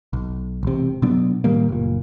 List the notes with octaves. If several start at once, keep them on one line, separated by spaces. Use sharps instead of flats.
B1
E1 C3
B2 F#3 B3 D4
A2 D#3 G3 A#3
F#1 A#2